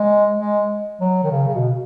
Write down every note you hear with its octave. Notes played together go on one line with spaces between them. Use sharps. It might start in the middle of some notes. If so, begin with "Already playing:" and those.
Already playing: G#3
G#3
F#3
D#3
C#3
C#3
B2